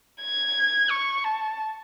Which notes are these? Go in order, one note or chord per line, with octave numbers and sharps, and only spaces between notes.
G#6
C#6
A5